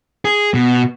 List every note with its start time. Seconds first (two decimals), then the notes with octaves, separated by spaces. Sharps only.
0.25 G#4
0.54 B2